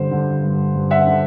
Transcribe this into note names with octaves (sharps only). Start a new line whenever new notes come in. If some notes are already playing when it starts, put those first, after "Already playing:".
Already playing: G2 D3 C5
D3
G2
G2
E5 F#5
D3